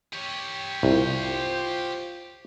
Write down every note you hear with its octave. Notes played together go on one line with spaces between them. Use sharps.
G4 C#5
C2 F4 C5